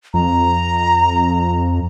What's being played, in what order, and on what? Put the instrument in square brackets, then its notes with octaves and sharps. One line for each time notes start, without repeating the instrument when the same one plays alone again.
[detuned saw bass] F2 [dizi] A#5